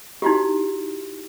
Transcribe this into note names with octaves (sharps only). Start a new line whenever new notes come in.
D#4 E4 F#4 G4